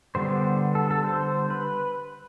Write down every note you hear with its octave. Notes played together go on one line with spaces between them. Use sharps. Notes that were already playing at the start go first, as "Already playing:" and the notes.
D3 G3 B3 C5
A4
A4
C5
B4